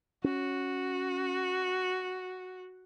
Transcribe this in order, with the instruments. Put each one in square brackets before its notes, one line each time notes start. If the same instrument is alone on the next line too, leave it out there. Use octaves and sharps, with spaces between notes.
[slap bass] C#4 [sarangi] F#4